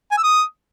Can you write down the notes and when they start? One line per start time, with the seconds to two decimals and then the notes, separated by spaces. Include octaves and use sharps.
0.11 G#5
0.17 E6
0.23 D#6